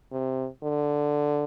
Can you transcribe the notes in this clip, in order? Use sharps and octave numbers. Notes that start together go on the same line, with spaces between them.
C3
D3